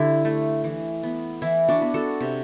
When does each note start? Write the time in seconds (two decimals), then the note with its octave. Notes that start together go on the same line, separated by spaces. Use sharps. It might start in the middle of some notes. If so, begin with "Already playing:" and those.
Already playing: D3 D4 E4 G4
0.25 A3
0.64 E3
1.03 B3
1.42 E3 E4
1.69 D4 F#4
1.82 B3
1.94 F#4 A4
2.21 C3